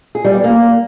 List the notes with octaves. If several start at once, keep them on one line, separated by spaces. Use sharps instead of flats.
G#4
G3
B3
A#3